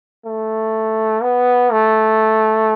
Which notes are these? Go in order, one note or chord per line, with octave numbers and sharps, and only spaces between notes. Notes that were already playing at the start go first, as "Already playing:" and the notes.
A3
B3
A3